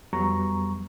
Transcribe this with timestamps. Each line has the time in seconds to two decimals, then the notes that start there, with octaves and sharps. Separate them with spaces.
0.13 F2 F#3 G3 B3 A#5 C#6